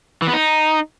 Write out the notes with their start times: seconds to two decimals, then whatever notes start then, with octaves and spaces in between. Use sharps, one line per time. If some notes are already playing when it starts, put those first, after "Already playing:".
0.22 E3
0.27 B3
0.33 D#4